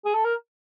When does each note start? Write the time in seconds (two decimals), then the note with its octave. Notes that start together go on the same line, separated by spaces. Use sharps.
0.05 G#4
0.14 A4
0.25 A#4